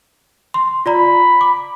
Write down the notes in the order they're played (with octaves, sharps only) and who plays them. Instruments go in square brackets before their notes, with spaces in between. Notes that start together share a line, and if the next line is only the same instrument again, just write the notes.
[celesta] C6
[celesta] F4 D5 A#5 [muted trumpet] B5
[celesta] D6